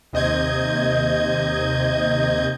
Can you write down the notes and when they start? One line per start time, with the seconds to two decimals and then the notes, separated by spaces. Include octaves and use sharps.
0.13 D#2 C3 D#5 G6 G#6